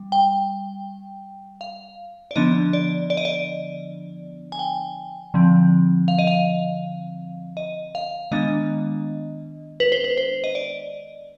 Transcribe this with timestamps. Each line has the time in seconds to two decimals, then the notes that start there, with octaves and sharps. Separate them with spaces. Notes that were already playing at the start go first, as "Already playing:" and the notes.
Already playing: G3
0.12 G5
1.61 F5
2.31 D5
2.36 D3 F3 B3 D4 D#5
2.73 D5
3.10 D5
3.17 D#5
3.25 D5
4.52 G#5
4.59 G5
5.34 D3 F3 C4
6.08 F5
6.19 D#5
6.27 F5
7.57 D#5
7.95 F5
8.31 D#3 G#3 B3 D4 D#5
9.80 B4
9.92 C5
10.04 B4
10.17 C5
10.44 D#5
10.55 D5